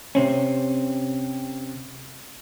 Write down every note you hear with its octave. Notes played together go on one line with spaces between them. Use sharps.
C3 C4 C#4